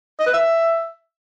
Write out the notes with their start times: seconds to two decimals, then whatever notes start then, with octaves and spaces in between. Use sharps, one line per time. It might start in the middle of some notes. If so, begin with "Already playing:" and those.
0.20 D#5
0.27 B4
0.33 E5